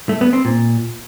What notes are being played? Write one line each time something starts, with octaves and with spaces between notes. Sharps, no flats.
A3
B3
C4
A#2